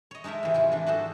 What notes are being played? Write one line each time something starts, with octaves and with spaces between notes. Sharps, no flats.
C#5 D#5
G#3 D#4 A4 A#4 E5
C3 E3
G#2 E4 F4
E3 D4
B3 F#4 G#4 A4 C5